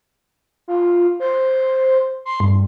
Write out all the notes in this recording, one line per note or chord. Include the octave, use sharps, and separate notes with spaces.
F4
C5
C6
G2